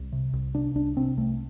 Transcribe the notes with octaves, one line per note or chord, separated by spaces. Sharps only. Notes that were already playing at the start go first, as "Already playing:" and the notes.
Already playing: C2
C3
C2
C3 D4
C2 D4
C3 C4
C2 A3